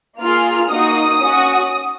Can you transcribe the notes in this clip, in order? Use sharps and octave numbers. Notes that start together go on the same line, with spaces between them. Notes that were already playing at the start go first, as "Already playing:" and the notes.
A#3 F4 G#4 F6
A#3 D#4 F#4 D#6
C#4
F#4